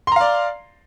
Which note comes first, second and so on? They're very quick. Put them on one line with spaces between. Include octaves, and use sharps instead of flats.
C6 A#5 F5 D5